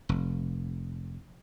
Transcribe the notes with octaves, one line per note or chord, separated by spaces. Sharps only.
F1